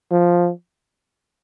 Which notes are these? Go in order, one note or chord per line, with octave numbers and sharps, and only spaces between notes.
F3